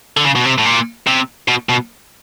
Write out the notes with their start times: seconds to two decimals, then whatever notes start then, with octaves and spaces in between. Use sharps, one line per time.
0.17 D3
0.24 C#3
0.36 B2
0.46 C3
0.58 A2
0.65 A#2
1.07 C3
1.48 B2
1.69 B2